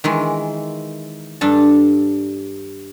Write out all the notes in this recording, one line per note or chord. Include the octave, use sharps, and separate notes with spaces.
D#3 E3 G#3
G2 D4 A4